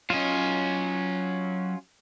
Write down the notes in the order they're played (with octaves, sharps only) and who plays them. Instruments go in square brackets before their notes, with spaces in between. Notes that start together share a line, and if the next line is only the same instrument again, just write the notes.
[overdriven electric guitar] F#3 D#5 [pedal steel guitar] C#4 F4